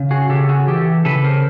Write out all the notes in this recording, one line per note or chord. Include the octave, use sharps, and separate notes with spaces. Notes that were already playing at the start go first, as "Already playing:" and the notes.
Already playing: C#3
F#4 G#4
C#3 G4 A4
F#4 G#4
E3 G4 A4
C#3 A4 B4
A#4 C5